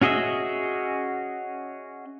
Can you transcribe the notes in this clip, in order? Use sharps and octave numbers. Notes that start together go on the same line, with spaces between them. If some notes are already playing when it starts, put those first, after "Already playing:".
C#4 F#4 G#4 D#5 E5